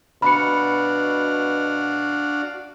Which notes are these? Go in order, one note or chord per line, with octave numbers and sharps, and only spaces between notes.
B2 D4 F#4 F5 B5 C#7